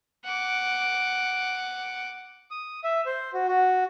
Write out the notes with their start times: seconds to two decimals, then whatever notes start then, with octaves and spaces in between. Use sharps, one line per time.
0.25 F#5 D6
2.51 D#6
2.84 E5
3.06 C5
3.34 F#4
3.48 F#4